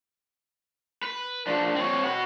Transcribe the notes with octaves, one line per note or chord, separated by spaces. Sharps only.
B4
F3 D4
C4 C#5
F#4 B4